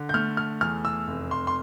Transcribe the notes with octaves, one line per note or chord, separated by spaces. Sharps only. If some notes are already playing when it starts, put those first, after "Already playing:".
Already playing: D3
G6
A3 F6
F6
E2 F6
E6
F1
C6
C6